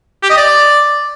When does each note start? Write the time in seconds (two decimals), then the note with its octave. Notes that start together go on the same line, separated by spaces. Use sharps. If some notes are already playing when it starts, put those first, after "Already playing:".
0.23 G4
0.30 D#5
0.37 D5